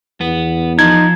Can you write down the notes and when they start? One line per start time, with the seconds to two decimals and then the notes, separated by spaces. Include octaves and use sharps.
0.21 E2 B3
0.79 F3 D#4 G#6